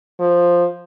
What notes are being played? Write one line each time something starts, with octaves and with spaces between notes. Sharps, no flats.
F3